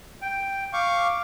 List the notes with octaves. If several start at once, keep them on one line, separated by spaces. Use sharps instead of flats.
G5
F5 C#6 D6